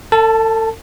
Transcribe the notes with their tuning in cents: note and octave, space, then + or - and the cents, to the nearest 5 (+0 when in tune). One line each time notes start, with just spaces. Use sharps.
A4 +35 A5 +0